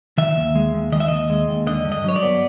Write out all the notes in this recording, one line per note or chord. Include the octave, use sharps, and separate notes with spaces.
D#3 E5
D#2
G#3
D#2
D#3 D#5
E5
D#2 D#5
G#3
D#2
D3 D#5
G2
D#5
F#3 C#5
D5
B3